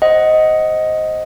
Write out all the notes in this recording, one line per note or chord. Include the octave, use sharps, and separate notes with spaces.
C5 D#5 F#5